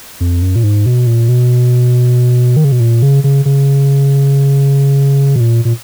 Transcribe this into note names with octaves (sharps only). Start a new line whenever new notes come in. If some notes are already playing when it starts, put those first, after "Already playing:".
F2
F#2
A#2
G#2
B2
A#2
B2
D#3
C#3
B2
A#2
C#3
C#3
C#3
B2
A#2
A#2